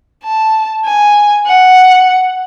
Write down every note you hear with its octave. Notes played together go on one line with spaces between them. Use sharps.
A5
G#5
F#5